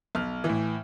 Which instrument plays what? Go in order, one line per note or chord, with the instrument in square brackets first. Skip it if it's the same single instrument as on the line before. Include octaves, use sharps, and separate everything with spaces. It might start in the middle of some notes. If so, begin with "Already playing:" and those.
[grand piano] B1 F6
E3
A2